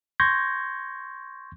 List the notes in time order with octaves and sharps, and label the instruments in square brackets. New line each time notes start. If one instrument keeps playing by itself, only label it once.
[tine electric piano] C6 C#6 G6 G#6 A#6